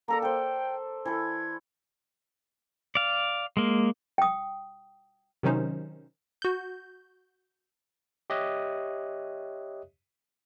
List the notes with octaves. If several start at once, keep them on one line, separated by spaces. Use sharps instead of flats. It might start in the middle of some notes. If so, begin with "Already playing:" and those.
A#3 A4 D5 A#5
A4 C5 G5
E3 A4 G#6
D5 F5
G#3 A#3
G5 D#6
C3 D#3 F#3 C#4 D#4 C5
F#4 G6
G4 C#5 D#5 E5 D#6 F#6